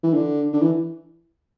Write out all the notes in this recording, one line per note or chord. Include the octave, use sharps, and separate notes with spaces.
E3
D3
D3
E3